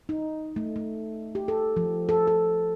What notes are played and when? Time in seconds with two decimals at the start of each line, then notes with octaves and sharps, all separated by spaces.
0.09 D#4
0.56 A3
0.76 A3
1.35 G4
1.48 A4
1.77 F3
2.09 A4
2.27 A4